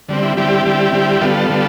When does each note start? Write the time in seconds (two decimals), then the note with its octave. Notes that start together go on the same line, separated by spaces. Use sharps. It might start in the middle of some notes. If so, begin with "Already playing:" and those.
0.09 D3 G3 C4
0.23 E4
0.37 D3 G3 C4 E4 G4
0.65 D3 G3 C4
0.93 D3 G3 C4
1.21 D3 G3 B3 F4 A4
1.49 D3 G3 B3